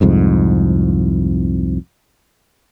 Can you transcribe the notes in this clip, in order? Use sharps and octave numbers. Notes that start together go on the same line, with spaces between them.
C2 F2 G#2